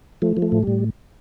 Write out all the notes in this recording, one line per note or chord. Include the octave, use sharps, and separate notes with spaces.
F3 A3
F3
A3
A2
A2 G3